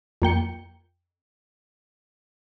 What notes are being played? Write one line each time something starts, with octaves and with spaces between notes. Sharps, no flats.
F2 A#3 G5 C#7